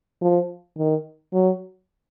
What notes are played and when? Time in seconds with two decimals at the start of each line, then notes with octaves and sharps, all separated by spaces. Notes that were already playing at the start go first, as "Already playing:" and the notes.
0.22 F3
0.78 D#3
1.33 F#3